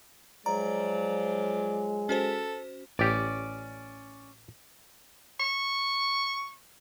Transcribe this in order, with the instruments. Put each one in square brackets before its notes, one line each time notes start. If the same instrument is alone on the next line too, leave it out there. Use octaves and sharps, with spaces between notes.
[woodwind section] F3 F#3 [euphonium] G#3 [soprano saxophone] D5 [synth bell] A#5
[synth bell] C#4 F#4 C5 [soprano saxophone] A4
[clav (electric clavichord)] A1 G4 [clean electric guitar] C#4 D5
[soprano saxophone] C#6